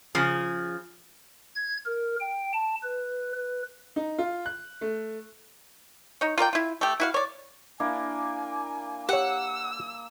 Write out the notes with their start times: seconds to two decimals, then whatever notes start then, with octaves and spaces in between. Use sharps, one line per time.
0.15 C#3 F3 G#4
1.55 G#6
1.86 A#4
2.20 G5
2.53 A5
2.83 B4
3.35 B4
3.96 D#4
4.18 F4
4.46 F#6
4.81 A3
6.21 D#4 C#5
6.38 F4 A#4 D5 G5
6.53 E4 F4
6.81 A3 G4
7.00 E4 F#4 F5
7.14 C#5 D5
7.80 A#3 D4 E4 G#5
9.09 G4 C#5 F#5 E6